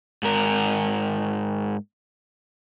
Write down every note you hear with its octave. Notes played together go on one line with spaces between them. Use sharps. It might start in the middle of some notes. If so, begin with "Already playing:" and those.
G#2 A#4